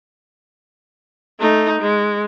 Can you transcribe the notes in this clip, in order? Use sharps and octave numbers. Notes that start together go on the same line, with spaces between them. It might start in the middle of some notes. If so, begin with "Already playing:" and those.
A3 D#4
G#3